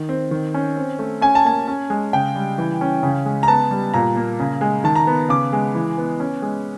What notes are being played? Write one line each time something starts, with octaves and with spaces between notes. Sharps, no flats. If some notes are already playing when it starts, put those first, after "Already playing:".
Already playing: D#3
C4
D#3
C#4
C4
A3
C#4 G#5
A5
A#3 G#5
C#4
G#3
C#3 G5
G3
E3
C#4
C#3
G#3
A#5
B3 A5
G3
A#2 A#5
A#3
C#3
G#3
D#3 A5
A#5
B3
C#3 D6
G#3
E3
B3
C#4
G#3